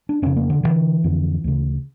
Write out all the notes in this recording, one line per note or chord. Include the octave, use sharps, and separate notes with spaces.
D4
F2 C#3 C#4
A#3
D3
D2 D3 E3
F2 D3
D2 C#3